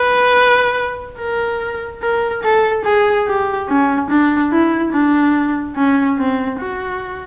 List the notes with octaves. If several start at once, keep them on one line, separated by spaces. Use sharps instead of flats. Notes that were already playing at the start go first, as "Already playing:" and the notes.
Already playing: B4
A#4
A#4
A4
G#4
G4
C#4
D4
E4
D4
C#4
C4
F#4